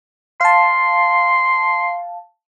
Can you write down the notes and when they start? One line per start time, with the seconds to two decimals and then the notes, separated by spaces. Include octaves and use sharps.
0.41 F5 A5 C6